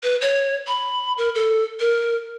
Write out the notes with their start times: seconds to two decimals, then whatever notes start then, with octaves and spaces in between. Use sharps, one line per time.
0.03 B4
0.21 C#5
0.67 B5
1.18 A#4
1.35 A4
1.80 A#4